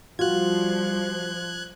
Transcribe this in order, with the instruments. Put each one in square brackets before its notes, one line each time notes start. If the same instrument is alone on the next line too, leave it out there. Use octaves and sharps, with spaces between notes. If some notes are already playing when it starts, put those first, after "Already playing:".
[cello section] F3 G3 [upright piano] F4 F#4 [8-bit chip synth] F#6 G#6